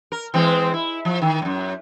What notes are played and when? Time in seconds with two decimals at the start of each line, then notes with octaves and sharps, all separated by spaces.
0.12 A#4
0.34 E3 G#3 C4
0.74 E4
1.05 F3
1.22 D#3
1.42 F#2 A2